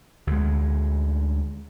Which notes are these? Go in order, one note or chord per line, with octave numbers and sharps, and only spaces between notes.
D2 G#3